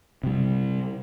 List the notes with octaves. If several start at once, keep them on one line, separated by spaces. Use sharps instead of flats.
C3 G3